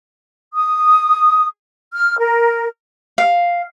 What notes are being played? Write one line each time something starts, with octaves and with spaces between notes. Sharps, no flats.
D#6
F6
A#4
F5